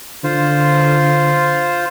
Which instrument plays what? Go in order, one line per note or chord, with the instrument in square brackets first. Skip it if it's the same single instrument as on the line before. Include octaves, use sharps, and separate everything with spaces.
[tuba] D3 [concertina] F4 C5